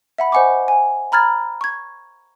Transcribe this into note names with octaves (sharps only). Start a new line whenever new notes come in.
E5 F#5 B5
C5 D#5 F#5 G#5 C#6 D6
G#5
A#5 B5 F6 G#6 A6
C#6 G#6